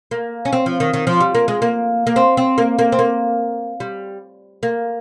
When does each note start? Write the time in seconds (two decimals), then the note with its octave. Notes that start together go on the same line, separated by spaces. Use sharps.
0.11 A#3
0.45 C#4
0.53 C4
0.66 F3
0.80 D#3
0.93 D#3
1.07 F3
1.21 G3
1.35 A#3
1.48 G#3
1.62 A#3
2.07 A#3
2.16 C4
2.37 C4
2.58 A#3
2.79 A#3
2.92 C4
2.99 A#3
3.80 G3
4.63 A#3